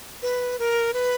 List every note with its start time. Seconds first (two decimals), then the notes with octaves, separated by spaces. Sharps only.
0.22 B4
0.59 A#4
0.94 B4